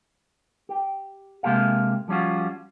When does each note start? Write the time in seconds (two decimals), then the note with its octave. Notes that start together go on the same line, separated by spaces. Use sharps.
0.69 G4
1.43 C3 G#3 A#3 G4 A4 F5
2.08 F3 G3 C#4 F4 F#4